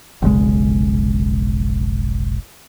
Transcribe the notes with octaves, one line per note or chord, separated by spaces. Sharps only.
F1 B1 C#3 G#3